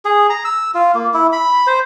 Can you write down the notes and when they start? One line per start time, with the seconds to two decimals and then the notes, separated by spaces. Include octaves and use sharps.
0.05 G#4
0.30 A#5
0.45 E6
0.74 F4
0.95 A#3
1.14 E4
1.33 B5
1.67 C5